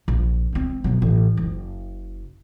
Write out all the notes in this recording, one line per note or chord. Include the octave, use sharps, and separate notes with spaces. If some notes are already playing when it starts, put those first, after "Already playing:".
A#1
G#3 C4
B2 F#3
A1
F#1